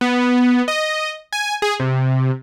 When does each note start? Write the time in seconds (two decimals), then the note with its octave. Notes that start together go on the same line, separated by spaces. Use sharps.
0.01 B3
0.68 D#5
1.33 G#5
1.62 G#4
1.80 C3